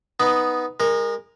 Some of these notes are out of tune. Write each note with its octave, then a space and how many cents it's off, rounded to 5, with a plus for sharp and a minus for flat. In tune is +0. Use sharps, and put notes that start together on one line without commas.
B3 +0 D#4 +0
G#3 -30 A#4 +0